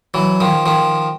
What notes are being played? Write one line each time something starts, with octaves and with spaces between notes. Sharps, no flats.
E3 F#3
D#3 F3
D#3 F3